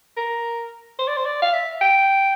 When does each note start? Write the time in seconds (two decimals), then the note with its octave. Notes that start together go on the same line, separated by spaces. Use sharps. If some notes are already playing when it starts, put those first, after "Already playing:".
0.17 A#4
0.99 C5
1.08 D5
1.17 C5
1.25 D5
1.42 F5
1.53 E5
1.81 G5